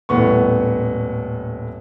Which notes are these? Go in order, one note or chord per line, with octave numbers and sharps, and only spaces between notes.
D#1 A2 B3 C#6